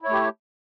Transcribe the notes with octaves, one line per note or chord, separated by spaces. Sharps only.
A3 E4 G4 C#5